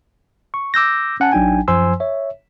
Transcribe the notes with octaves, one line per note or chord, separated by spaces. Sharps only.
C#6
D6 E6 G6 A#6
C#4 F#5 G#5 A5
A1 F#3 D4 D#4 G5 G#5
F#2 F3 C5 G#5 C6 E6
C#5 E5